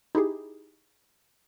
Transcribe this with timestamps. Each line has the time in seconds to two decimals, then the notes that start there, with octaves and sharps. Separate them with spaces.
0.15 D#4 E4 G4 G#4